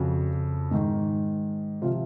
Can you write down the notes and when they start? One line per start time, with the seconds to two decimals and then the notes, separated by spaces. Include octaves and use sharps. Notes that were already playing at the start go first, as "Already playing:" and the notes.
Already playing: F2 C#3 F3 F#4
0.71 G#2 D#3
1.82 C3 F3 F4